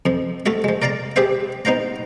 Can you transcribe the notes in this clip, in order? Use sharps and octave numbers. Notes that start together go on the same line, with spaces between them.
F2 F3
A3 F4 F#4 E5
F3 G#3
A#4 D5 F5 A5 A#5
G4 G#4 B4 C5 E5 F5
B3 D#4 C5 F5 A#5